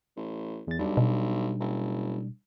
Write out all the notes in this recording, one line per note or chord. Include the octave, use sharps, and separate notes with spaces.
A1
E2 A6
B1 G3 D4
B2
F#1